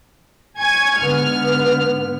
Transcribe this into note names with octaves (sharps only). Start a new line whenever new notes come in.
G#5 C#6 G#6
G#2 D3 B3 F6